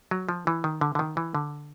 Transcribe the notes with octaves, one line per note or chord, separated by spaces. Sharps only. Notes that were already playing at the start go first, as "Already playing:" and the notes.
F#3
F3
E3
D#3
D3
D3
D#3
E3
D3